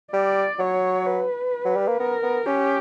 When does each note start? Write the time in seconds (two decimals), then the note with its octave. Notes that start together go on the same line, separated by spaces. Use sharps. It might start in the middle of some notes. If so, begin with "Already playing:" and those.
0.13 G3 D5
0.59 F#3 C#5
1.07 B4
1.65 F#3
1.76 G3
1.88 A#3
2.00 B3 A#4
2.23 B3
2.46 C#4 G4